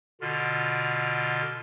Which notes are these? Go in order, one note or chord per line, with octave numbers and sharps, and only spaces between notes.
B2 D3 F4 F6